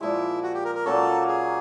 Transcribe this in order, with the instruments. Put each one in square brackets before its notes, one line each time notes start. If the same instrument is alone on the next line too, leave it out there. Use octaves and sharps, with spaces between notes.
[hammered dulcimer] A#2 F3 G#3 [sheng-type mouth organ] E4
[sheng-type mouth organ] F#4
G4
A#4
A#4
[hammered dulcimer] A#2 F#3 A#3 C#4 [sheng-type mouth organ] A4
[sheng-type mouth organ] G#4